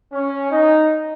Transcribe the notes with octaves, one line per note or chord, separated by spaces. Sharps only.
C#4
D#4